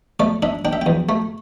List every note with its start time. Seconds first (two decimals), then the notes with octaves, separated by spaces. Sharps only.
0.20 A3 D5
0.42 D4 E5
0.65 D4 G5
0.73 E5
0.81 E2 G5
1.09 A3